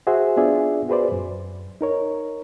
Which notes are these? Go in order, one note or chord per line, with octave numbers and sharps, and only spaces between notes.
F#4 G#4 C5 E5 F#5
B3 D4 F4 G#4 D5 E5
F#4 G#4 B4 C5 D5
F#2
D#4 A#4 C#5